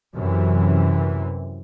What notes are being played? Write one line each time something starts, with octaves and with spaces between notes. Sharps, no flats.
F#2 C3 E3